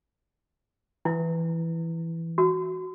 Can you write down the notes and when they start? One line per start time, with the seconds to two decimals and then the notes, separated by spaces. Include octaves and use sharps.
1.05 E3 E4
2.38 F#4